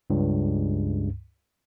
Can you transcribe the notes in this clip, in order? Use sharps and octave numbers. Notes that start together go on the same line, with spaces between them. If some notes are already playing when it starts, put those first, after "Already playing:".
C#2 G2